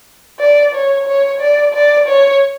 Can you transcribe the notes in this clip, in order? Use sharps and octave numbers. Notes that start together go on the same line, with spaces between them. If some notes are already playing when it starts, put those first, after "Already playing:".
D5
C#5
C#5
D5
D5
C#5